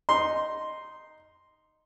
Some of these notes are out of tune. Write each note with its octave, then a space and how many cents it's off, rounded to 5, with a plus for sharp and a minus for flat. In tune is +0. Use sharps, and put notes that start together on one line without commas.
D#4 +0 C6 +0